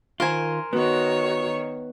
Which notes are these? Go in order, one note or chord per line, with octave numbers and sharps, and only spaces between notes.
D#3 F4 A#4 C5 G#5
D#3 B3 F#4 C#5